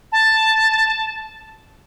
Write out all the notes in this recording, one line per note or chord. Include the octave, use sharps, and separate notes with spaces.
A5